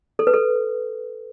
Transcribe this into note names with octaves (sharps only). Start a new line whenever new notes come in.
A4
B4
A4